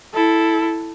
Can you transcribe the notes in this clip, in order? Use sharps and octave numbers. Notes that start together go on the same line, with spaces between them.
E4 A4